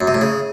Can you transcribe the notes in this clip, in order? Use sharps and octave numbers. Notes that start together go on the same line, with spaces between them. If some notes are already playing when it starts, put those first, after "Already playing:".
F#2
C3
A2
C#3